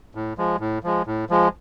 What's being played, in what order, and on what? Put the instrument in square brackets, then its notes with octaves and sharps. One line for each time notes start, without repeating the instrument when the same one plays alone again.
[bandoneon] A2
F3 G#3
A2
F3 G#3
A2
F3 G#3